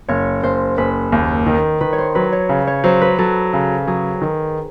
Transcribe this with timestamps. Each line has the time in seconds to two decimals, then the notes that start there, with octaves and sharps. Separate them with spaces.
0.08 F#1 C#5
0.43 F#1 C5
0.77 F#1 B4
1.12 D#2
1.46 D#3
1.81 D#3 B4
1.93 C#5
1.98 C5
2.15 F#3 B4
2.32 C#5
2.49 C#3
2.67 C#5
2.84 F#3 C5
3.01 B4
3.18 F#3 A4
3.53 C#3
3.87 F#3 G#4
4.22 D#3